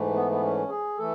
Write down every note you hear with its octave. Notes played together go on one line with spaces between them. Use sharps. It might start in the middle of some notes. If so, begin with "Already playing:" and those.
Already playing: G#2 E3 A3
B3
B3
C#4
G#4
E3 A3 A4